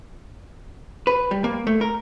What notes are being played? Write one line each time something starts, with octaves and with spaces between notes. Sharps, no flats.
B4
G3
A#3
A3
A#4